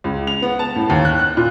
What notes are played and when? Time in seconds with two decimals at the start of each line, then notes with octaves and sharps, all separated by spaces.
0.04 C#2
0.27 F7
0.42 B3
0.59 A5
0.75 A2
0.90 D#2
1.05 F#6
1.19 F#6
1.37 A#2